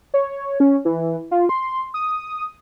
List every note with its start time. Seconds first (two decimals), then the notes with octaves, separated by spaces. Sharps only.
0.14 C#5
0.60 C#4
0.85 E3
1.31 F4
1.49 C6
1.94 D#6